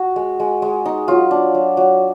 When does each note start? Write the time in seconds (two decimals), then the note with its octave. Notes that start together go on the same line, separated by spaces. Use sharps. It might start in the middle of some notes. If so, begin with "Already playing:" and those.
Already playing: F#4
0.16 G#3
0.40 G#3
0.62 G#3
0.85 D#4
1.08 F#3 F4
1.31 D4
1.55 F#3
1.77 F#3